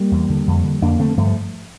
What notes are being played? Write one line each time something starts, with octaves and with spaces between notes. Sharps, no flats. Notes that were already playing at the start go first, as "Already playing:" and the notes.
Already playing: G3 A#3
E2
D3
F2
D3
F2 A#3 D4
D3 A3 C4
G2 F3 A3